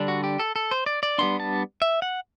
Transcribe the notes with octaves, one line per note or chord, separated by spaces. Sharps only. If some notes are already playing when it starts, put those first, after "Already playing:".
Already playing: D3 G3 D4
F#4
G4
A4
A4
C5
D5
D5
G3 B3 D4 C6
A5
E5
F#5